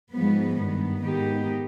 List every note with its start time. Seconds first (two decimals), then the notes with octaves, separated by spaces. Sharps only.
0.13 G#2 F3 G#3 B3
0.57 G2 D#3 B3
1.02 G#2 D#3 B3 D#4 G4